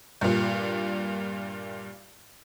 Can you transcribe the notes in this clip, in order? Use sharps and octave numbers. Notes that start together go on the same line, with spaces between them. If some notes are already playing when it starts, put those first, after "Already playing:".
G2 A#2